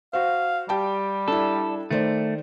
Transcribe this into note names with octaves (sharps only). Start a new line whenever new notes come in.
F#4 C5 F5
G3 G4 G5 A5
D4 E4 A4
D#3 A3 C5 D5